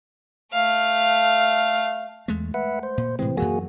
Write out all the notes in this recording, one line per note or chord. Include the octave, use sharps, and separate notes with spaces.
A3 F5
E2 G#3 A3
B4 E5 F#5
C5
A#2
A2 C3 E3 G#3 C4
F#2 E3 F#3 A#3 F#4 G#4